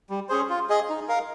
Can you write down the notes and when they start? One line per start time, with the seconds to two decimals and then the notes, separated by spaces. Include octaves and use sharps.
0.10 G3
0.29 C#4 G#4 C5
0.49 F4
0.69 G#4 D#5
0.90 D#4
1.08 A#4 F5